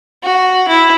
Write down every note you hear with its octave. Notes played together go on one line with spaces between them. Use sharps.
F#4
E4